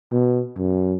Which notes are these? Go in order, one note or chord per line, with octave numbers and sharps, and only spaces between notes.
B2
F#2